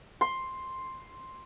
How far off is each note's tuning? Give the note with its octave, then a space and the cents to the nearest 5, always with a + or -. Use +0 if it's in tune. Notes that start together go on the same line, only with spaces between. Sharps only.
C6 +5